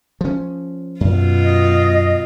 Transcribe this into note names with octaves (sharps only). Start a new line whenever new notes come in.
F3 C#4
F#2 B2 F4
D#5